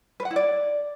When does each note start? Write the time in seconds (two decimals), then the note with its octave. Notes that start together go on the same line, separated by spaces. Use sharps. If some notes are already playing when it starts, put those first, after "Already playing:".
0.20 B4
0.25 F#5
0.31 E4
0.36 D5